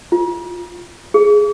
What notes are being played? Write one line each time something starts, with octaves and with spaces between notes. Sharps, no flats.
F4
G#4